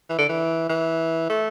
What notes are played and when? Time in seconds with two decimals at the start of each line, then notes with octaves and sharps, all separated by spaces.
0.09 E3
0.19 D3
0.29 E3
0.69 E3
1.30 A3